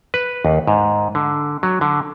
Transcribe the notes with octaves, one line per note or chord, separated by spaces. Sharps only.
B4
D#2
G#2
D3
F#3
D3